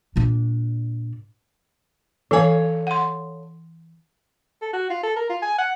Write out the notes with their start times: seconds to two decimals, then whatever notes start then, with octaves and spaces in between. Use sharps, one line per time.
0.16 A#2 D4
2.31 E3 A4 C#5 F5 G#5
2.87 F#5 C6
4.62 A4
4.73 F#4
4.90 F4
5.03 A4
5.16 A#4
5.30 F4
5.42 G#5
5.59 F#5